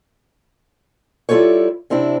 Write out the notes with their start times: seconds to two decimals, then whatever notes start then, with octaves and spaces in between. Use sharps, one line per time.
1.29 G3 E4 F4 A4 C5 C#5
1.90 C3 C4 D4 E4